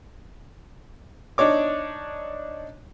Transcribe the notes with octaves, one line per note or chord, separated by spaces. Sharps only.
D4 D#4 C#5 D6